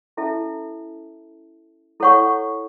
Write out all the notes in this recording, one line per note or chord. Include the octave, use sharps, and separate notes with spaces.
C#4 E4 A4 E5 A5
E4 A4 C#5 F#5 C#6